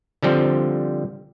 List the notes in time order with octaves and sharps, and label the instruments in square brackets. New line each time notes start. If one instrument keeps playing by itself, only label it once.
[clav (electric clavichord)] D3 F3 G3 C4